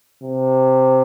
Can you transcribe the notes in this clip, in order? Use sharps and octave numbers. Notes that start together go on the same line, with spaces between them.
C3